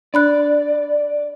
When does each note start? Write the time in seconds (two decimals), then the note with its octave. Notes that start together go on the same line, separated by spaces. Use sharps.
0.14 D4 D5 B5 F#6